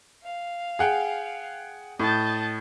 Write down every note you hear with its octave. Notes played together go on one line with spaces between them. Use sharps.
F5
G#4 F#5 G5
A2 D#5 A5 G6